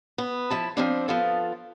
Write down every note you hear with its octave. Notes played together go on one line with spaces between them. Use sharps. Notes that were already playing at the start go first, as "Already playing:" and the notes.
B3
F3 E4 A5
F3 C4 D4
F3 B3 F4 A4